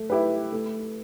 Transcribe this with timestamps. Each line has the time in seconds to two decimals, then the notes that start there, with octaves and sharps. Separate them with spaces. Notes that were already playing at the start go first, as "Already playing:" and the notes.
Already playing: A3
0.10 E4 G4 B4
0.52 A3